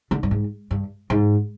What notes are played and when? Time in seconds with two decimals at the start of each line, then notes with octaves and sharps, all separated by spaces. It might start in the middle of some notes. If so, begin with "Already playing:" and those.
0.11 D3
0.23 G2
0.31 G#2
0.71 G2
1.10 G#2